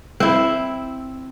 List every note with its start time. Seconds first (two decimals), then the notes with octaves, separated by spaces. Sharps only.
0.20 C4 E4